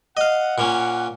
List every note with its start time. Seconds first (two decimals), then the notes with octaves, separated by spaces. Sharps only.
0.17 D#5 F5 F#5
0.58 A#2 A#3 C#4